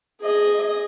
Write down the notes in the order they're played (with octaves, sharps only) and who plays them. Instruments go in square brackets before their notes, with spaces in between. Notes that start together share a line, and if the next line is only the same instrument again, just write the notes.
[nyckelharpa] G#4 D#5